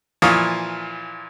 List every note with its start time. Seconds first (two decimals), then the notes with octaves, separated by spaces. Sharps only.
0.22 A#2 E3 F3 F5 C#6 D#6